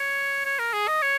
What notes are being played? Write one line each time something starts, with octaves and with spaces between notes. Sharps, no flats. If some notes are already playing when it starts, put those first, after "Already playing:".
Already playing: C#5
C#5
A#4
G#4
D#5
C#5